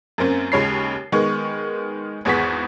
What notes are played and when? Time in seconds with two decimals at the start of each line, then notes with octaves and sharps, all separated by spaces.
0.18 F#2 A#3 C4 C#4
0.52 D#2 C#3 G#3 C#5 B5 C7
1.12 D#3 G#3 B3 C#6
2.25 G#1 E2 B3 G#4 C#6 B6